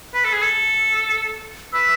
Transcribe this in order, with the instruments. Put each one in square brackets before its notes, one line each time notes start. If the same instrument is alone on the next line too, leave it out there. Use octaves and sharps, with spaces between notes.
[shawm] B4
A4
G#4
A4
[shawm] B4 [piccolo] E6